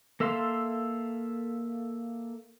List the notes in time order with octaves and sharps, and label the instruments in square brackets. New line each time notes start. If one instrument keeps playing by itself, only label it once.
[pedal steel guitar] A#3 A4 E5 F5 C6